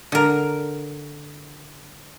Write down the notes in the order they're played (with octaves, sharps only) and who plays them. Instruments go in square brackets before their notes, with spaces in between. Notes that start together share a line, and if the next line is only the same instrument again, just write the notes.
[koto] D3 A#4